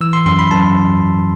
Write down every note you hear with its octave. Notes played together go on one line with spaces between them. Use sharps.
E3 E6
C6
F#2 C6
B5
F#2 A5